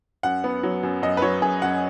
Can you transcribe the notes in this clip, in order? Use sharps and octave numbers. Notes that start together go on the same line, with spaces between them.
F#2 F#5
B3
F#3
F#2
F#2 D#5
B4
F#3 C#5
F#2 G#4
F#2 F#5